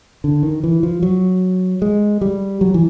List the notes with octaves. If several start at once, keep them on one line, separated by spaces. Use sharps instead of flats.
D3
D#3
E3
F3
F#3
G#3
G3
F#3
E3